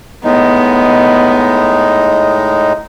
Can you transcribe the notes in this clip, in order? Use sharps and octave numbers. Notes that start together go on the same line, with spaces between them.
A2 G#3 B3 D#4